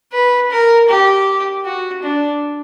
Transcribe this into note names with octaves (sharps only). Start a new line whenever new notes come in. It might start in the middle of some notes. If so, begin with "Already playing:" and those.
B4
A#4
G4
F#4
D4